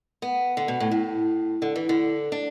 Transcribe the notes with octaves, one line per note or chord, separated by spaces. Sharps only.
B3
D3
B2
A2
A2
D3
E3
D3
D4